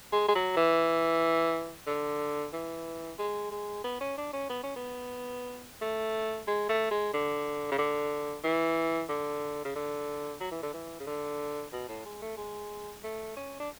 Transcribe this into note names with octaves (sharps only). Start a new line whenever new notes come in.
G#3
G#3
F#3
E3
D3
E3
G#3
G#3
B3
C#4
D4
C#4
B3
C#4
B3
A3
G#3
A3
G#3
D3
C#3
D3
E3
D3
C#3
D3
F#3
E3
D3
E3
C#3
D3
B2
A2
G#3
A3
G#3
A3
C#4
D4